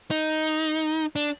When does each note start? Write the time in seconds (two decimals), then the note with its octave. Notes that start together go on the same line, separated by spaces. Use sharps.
0.11 D#4
1.16 D4